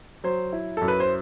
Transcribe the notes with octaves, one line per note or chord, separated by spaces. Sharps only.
F#3 C5
E4
F#2 A4
B4
C5